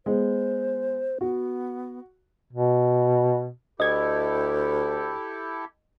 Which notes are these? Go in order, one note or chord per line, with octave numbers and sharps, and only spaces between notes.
G#3 B3 C5
B3 F#4
B2
D2 E4 G4 A4 D#5 G#6